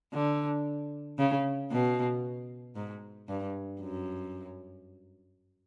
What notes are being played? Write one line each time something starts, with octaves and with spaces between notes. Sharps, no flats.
D3
C#3
B2
G#2
G2
F#2